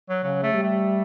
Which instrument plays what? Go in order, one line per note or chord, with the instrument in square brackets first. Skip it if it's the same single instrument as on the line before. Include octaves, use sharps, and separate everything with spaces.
[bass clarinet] F#3
[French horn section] C#3 [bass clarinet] F#3
[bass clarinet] A3
[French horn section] G3
[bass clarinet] A3